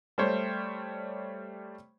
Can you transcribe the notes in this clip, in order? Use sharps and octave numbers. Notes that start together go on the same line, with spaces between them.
G3 A3 C5 C#5